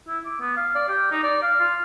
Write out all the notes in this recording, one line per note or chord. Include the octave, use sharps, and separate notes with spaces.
E4
D6
B3
F5
D5
G4
D#4
D5
F5
F4